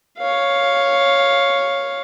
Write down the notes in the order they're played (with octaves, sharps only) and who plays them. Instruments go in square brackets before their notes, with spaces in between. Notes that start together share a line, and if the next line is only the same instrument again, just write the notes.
[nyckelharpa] C#5 F5